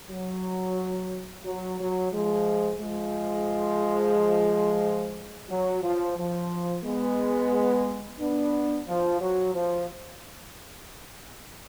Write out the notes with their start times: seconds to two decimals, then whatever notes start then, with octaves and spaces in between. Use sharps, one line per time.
0.10 F#3
1.45 F#3
1.79 F#3
2.12 F3 G#3
2.80 F3 G#3
5.50 F#3
5.83 F3
6.17 F3
6.84 G#3 B3
8.19 B3 D4
8.87 F3
9.21 F#3
9.54 F3